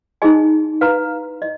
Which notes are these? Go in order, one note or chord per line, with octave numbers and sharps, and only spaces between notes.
D#4 G#4 D#5 G#5
B4 F5 A#5
D#5